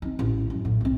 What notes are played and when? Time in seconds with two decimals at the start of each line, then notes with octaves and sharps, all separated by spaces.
0.02 C4 D#4
0.19 A1
0.50 F#2
0.65 A2
0.81 B1 C4